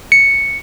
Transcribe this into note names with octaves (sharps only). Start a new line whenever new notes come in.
C#7